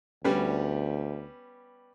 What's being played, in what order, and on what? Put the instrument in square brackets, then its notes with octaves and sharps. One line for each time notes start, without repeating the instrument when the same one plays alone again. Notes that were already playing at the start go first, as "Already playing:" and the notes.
[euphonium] D2 [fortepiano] G3 B3 C#4